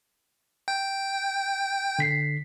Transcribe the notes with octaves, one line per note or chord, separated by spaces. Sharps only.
G5
D3 B6 C7